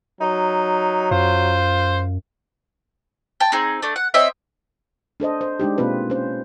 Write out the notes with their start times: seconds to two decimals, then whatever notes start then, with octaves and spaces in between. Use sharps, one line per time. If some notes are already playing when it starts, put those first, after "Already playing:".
0.21 F#3 D#4
1.11 F#2 F4 C5
3.40 G5 A5
3.52 C4 D#4 G#4
3.82 A3 D4
3.96 F#5
4.14 C4 C#5 D#5 E5
5.20 D4 A4 C5 D#5
5.41 C5
5.60 G#3 D4 D#4 G4
5.78 B2 A#3 C4 F4 B4
6.10 C#4 C5